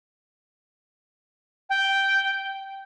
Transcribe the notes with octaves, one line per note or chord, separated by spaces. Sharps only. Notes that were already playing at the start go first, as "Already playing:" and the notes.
G5